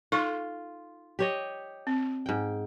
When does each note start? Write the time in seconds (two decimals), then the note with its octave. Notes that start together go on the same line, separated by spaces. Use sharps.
0.12 D#4 F4 A4 C#6
1.19 G4 C#5 D#5
1.87 C4
2.26 G#2 G5